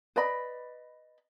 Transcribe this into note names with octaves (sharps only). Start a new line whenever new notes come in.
B4 D5 D#5 B5